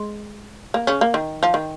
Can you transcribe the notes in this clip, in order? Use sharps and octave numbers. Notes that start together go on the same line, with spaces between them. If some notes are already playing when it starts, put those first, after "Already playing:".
Already playing: G#3
A#3
C#3 C#4
A#3
D#3
F3
D#3